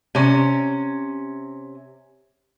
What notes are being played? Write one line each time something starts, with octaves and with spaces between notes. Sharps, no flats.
C3 C#4